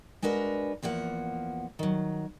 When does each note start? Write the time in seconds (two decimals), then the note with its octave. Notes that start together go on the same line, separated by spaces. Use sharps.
0.22 G#3 D4 F#4 A#4 B4
0.83 E2 F3 A#3 F#5
1.79 D#3 F#3